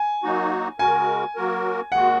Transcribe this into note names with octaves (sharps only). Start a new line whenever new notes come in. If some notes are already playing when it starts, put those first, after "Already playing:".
Already playing: G#5
F#3 A#3 D#4 F#4
C#3 G#3 F#4 A#4 G#5
F#3 A#3 F#4 A#4
D#2 D#3 G#3 F#4 F#5